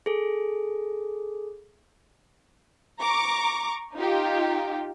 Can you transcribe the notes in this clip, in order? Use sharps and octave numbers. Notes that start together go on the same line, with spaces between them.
G#4 A4
A#5 C#6 D6
D#4 F4 G4